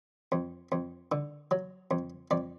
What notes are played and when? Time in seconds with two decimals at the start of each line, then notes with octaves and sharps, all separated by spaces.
0.32 F2
0.72 F2
1.12 D3
1.51 F#3
1.91 F2
2.31 F2 D5